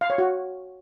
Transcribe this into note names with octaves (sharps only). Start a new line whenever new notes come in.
F5
C#5
F#4